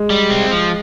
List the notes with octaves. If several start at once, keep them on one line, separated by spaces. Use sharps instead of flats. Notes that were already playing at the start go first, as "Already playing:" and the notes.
Already playing: G#3
G3
C4
F3